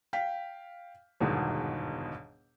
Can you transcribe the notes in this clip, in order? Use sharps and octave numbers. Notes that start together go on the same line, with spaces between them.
F5 G5 B6
G1 E2 G#2 B2 D#3